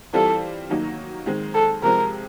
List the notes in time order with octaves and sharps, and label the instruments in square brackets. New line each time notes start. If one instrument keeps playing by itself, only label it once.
[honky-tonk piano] E3 G3 C4 F4 [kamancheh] A4
[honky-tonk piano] D#3 F#3 A#3 D#4
D#3 G#3 C4
[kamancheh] A4
[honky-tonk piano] C3 F3 G#3 C4 [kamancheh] A#4